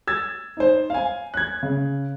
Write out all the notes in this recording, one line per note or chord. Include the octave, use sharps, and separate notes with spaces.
E6 G#6 A6
D#4 C5
F5 G#5
F#6 G#6
C#3